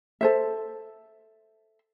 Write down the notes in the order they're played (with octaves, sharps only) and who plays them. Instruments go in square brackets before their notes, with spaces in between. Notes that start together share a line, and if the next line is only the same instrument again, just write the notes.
[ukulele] A4 C5 E5